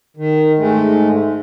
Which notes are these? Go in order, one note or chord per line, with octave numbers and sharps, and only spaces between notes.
D#3
G#2 G#3 A3